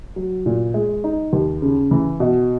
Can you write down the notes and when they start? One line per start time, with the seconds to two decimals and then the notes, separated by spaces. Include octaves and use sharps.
0.16 F#3
0.46 A#2
0.74 G#3
1.04 D#4
1.33 D#2
1.62 C#3
1.91 E3
2.20 B2